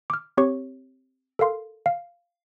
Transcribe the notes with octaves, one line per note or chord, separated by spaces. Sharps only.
D6 F6
C4 G4 C#5 C#6
A4 A#4 F5 C6
F5